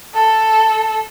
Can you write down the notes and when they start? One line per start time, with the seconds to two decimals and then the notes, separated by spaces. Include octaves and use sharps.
0.14 A4